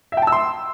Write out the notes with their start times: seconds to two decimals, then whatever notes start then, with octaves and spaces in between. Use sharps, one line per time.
0.12 E5
0.17 G5
0.22 A5
0.27 E6
0.32 C6